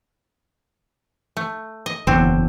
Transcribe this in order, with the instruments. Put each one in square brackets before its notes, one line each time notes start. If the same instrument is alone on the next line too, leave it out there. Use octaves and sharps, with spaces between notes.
[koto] A3
D#5
[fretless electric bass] F#1 E2 [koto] D3 F#3 C4